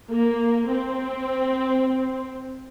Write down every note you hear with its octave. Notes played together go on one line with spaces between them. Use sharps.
A#3
C4